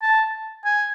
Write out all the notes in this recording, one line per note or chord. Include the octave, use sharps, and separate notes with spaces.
A5
G#5